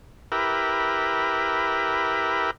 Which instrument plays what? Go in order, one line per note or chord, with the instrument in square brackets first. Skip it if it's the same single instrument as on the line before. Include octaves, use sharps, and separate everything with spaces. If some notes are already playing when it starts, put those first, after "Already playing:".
[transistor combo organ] E4 G4 A#4 B4